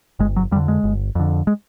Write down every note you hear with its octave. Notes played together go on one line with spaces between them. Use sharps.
G1 G#3
F#3
F2 D3 G3
G#3
G1
F2 D3
G#3